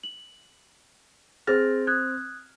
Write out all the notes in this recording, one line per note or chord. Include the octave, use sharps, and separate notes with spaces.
F#7
C4 G#4 F6 A6 A#6
D#6 F#6 G#6